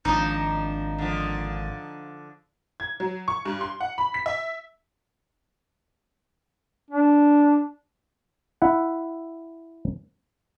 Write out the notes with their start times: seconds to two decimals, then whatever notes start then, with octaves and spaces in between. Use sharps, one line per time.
0.05 G#1 F3 D4 D#4 D#5
0.98 D3 F3
2.80 G#6
3.00 F#3
3.28 C#6
3.45 G2
3.61 C6
3.81 F#5
3.98 B5
4.14 B6
4.26 E5
6.91 D4
8.62 E4 E5 F#5